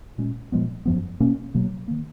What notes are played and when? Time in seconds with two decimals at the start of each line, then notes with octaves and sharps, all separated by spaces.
0.18 A#2 G#3 C#4
0.52 A#2 F3 G#3 B3
0.85 F#2 F3 B3
1.20 B2 A#3 C#4
1.54 B2 F#3 A#3
1.88 D#3 A#3